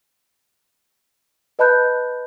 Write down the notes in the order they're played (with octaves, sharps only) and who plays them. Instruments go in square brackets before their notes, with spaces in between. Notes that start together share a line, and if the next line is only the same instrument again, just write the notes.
[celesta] B4 D#5 A5 B5 F#6 G6